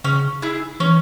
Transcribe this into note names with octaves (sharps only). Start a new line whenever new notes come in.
C#3 C#4
E4 G#4
E3 C#4